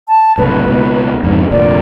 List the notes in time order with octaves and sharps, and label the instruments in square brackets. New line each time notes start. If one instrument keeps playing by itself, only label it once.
[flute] A5
[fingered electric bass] F#1 C2 A2 [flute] B4
[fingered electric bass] C#2 B2
F2 G#2 C#3
[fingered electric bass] F1 D2 A#2 [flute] D5